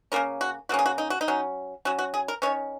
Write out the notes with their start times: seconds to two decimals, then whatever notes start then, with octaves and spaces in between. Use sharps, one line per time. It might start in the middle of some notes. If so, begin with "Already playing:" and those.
0.12 C#3 A#3 C#4 A#4
0.41 F#4
0.69 C#3 A#3 C#4 F#4
0.79 G#4
0.86 F#4
0.98 D#4
1.10 F#4
1.21 D#4
1.28 F#3 C#4
1.85 F#3 C#4 F#4
1.99 F#4
2.14 G#4
2.28 A#4
2.42 D#3 G#3 C#4 C#5